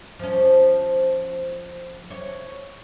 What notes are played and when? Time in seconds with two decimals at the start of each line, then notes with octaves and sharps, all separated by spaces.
0.19 F3 C#4
2.10 C#5